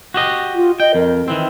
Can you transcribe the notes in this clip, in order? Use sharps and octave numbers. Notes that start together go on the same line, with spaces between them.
F#4 G4 D#5
F4
D#5 G5
F2 A#4
D#3 E3 C4 E4